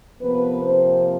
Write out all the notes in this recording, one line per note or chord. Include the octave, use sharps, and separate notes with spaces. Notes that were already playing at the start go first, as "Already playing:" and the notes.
C3 F3 A#3 B3 B4
C4 C5